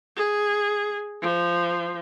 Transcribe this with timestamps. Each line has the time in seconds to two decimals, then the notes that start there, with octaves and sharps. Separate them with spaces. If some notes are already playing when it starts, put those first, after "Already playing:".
0.16 G#4
1.22 F3